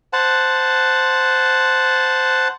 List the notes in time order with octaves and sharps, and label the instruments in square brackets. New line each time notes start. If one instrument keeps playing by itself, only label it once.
[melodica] C5 F#5 A5